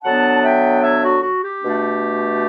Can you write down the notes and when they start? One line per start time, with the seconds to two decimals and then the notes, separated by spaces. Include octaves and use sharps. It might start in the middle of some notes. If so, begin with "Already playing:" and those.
0.04 D3 F#3 B3 D4 F#5 A5
0.43 E5 G5
0.82 C#5 E5
1.01 F#4
1.21 F#4
1.41 G4
1.60 B2 A3 D4